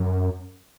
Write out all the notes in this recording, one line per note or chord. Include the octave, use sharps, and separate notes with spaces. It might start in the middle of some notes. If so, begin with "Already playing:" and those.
Already playing: F#2